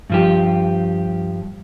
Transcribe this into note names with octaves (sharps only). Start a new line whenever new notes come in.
G2 F3 G4